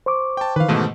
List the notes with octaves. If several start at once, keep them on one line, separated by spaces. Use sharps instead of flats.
C5 C#6 D6
G5 A5
D#3 E3 B4 F5
G#2 B2 A3